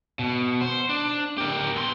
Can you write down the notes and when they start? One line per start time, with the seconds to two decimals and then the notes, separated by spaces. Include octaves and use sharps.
0.19 B2
0.61 C5
0.89 D4
1.38 G4 A#4
1.76 B3 C6